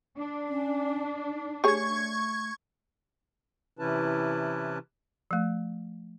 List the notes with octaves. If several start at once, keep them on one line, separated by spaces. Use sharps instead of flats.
D4
C#4
D#4
A3 G4 G#4 C#5 C#6 G#6
C3 E3 C#4 E4 B4 A5
F3 A3